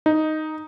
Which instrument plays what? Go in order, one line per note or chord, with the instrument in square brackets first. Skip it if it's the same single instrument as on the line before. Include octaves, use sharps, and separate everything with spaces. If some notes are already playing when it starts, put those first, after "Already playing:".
[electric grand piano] D#4